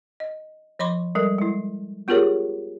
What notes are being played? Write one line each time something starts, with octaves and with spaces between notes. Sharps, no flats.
D#5
F3 D#5 B5 C6 D6
G3 G#3 A4 A#4
G#3 E4
B3 F4 G4 G#4 A#4 C#5